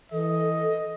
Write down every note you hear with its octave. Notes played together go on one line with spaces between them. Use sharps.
E3 A4 D#5